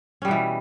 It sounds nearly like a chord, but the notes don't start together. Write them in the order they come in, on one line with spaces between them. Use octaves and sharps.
C#4 G3 B2 E3